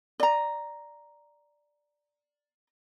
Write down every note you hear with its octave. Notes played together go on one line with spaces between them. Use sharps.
D5 A#5